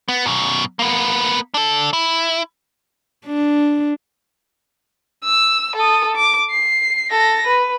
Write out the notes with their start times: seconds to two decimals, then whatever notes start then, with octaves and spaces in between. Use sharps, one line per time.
0.08 B3
0.26 F#2 B2
0.79 A#3 B3
1.54 D4 A4
1.93 E4
3.26 D4
5.24 E6
5.76 A4 D#6
6.16 D6
6.51 C7
7.11 A4 A#6
7.47 B4